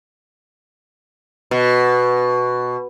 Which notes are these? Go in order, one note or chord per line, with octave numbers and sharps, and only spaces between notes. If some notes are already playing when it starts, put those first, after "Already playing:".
B2